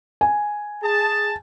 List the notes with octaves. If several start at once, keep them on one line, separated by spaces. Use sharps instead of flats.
G#5
G#4 A5